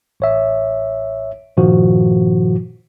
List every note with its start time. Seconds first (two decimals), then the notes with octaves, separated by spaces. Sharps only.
0.20 A1 C#5 E5
1.57 G2 A#2 D#3 F3 F#4